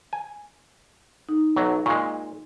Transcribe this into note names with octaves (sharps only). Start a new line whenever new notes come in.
G#5
D#4
B1 F#3
A#2 G#3 C#6